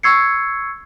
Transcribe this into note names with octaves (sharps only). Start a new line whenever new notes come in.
C#6 E6 G#6 C7 C#7